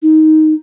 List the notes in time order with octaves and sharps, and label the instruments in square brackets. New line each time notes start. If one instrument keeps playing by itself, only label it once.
[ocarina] D#4